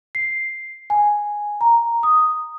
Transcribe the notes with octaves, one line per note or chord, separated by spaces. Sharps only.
C7
G#5
A#5
D#6